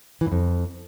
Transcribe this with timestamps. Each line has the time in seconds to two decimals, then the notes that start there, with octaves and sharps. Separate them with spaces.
0.21 E3
0.26 G2
0.32 F2